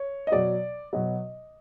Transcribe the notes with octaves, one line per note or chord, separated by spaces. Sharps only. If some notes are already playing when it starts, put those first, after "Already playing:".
Already playing: C#5
D#5
B2 F#3 D5
B2 F#3 D#5